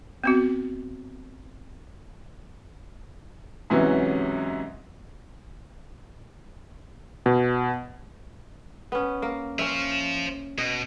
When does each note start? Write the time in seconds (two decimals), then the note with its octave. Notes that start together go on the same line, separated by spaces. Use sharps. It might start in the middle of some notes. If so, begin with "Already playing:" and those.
0.24 B3 C4 F#4
3.70 G#2 C3 E3 F#3 C#4
7.26 B2
8.92 B3 C#4
9.22 A#3
9.59 C#4 C5 E5 F5
10.58 B2 D#5